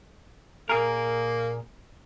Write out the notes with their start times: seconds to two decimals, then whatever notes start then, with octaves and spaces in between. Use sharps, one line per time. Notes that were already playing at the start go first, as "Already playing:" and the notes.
0.69 A#2 A#3 G#4 A#4